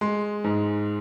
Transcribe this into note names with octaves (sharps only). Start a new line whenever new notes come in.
G#3 C6
G#2